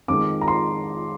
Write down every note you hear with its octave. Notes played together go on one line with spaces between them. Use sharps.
F2 D#3 G#3 D6
A#5
C6